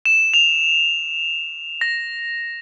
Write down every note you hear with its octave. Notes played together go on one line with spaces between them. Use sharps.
E7
F7
A#6